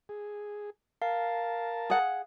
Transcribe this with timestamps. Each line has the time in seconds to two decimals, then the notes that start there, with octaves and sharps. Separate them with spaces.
0.09 G#4
1.02 A#4 F5 A5
1.90 G#4 F#5